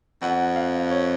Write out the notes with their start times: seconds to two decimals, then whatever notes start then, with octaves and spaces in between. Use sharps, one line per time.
0.22 F2 F#5
0.56 F5
0.79 F5
0.90 C#5